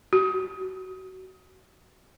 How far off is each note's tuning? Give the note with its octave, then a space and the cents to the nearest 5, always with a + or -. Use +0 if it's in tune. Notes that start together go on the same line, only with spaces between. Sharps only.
F#4 +25